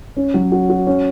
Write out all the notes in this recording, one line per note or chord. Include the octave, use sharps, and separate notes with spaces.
C#4
F#3
F#4
F#4
C#4